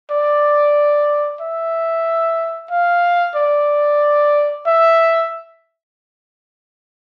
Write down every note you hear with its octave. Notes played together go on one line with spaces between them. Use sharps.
D5
E5
F5
D5
E5